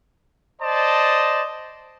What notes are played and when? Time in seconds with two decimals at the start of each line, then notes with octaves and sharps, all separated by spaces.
0.61 C5 D5 D#5 A5